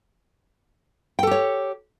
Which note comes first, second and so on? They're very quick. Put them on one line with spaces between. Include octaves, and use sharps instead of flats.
G5 A4 G4 C#5